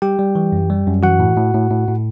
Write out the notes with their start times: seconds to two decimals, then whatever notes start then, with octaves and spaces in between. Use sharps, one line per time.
0.02 G3 G4 G5
0.19 G3
0.35 E3
0.52 F#2
0.70 G3
0.87 F#2
1.03 E3 F#4 F#5
1.19 A2
1.36 A2
1.54 A2
1.70 A2
1.88 A2